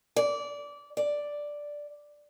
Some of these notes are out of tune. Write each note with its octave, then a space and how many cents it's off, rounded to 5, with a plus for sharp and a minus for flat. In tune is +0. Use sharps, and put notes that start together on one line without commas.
D5 -20
D5 +0